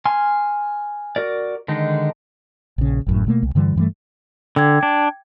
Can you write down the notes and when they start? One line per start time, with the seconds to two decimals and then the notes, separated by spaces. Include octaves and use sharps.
0.06 G#5 C6 F6
1.16 F#4 A#4 D5
1.68 D3 D#3 G#3 D#4
2.78 A#1 C#3
3.06 G#1 F#2 A2
3.27 B2 A3 A#3
3.42 C2
3.55 G2 D3 E3 G3
3.76 G2 E3 G3 A3
4.56 D3 G5 D6 G#6
4.83 D4